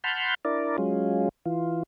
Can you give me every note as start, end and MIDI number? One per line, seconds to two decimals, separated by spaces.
0.04 0.35 78
0.04 0.35 81
0.04 0.35 83
0.04 0.35 84
0.04 0.35 89
0.04 0.35 91
0.45 0.77 62
0.45 0.77 64
0.45 0.77 70
0.45 0.77 74
0.78 1.29 54
0.78 1.29 56
0.78 1.29 61
0.78 1.29 65
1.45 1.83 52
1.45 1.83 65